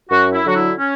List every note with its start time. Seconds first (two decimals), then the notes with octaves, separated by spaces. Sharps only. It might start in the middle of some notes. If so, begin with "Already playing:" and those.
0.10 F#2 F#4
0.32 E4
0.45 D3 F#3 F#4
0.55 E4
0.78 C#4